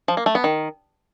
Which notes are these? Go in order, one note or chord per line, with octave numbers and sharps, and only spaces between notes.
F3
A#3
A3
B3
D#3